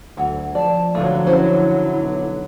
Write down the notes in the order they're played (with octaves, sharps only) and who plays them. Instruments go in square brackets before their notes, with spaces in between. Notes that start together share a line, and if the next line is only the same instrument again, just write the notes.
[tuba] D2 [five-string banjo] E3 F#3
[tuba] F3 [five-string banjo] D5 [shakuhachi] A5
[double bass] D3 F#3 [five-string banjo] A3 [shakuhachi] F5
[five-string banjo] C#4 C5 [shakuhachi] E4
[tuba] B1